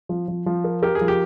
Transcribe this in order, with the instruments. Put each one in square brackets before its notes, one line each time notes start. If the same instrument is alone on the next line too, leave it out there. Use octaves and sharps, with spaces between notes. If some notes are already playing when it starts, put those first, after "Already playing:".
[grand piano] F3
F3
F3
A#4
[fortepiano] G4 [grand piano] A#4
[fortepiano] G#4
[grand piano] F3
[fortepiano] G4